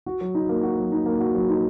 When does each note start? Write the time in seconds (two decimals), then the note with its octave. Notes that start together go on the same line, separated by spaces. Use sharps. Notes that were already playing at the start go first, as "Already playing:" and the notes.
0.06 F#4
0.21 F#3
0.35 D#4
0.49 A#3
0.63 F#4
0.77 F#3
0.92 D#4
1.06 A#3
1.20 F#4
1.35 F#3
1.49 D#4